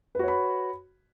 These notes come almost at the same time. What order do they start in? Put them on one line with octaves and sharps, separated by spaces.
B4 F#4 C#5 B5